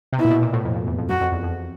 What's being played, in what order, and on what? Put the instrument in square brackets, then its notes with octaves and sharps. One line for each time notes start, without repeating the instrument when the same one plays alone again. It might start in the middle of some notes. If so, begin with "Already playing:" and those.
[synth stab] C3
[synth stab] B2 [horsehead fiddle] E4
[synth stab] A#2
B2
A#2
A2
F2
F2
E2
F2
[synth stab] F#2 [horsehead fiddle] F#4
[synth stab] F2
E2
F2